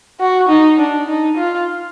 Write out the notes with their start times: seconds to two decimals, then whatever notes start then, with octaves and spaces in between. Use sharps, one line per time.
0.20 F#4
0.49 D#4
0.79 D4
1.08 D#4
1.37 F4